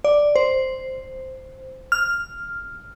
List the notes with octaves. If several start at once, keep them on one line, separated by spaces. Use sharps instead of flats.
D5
C5
F6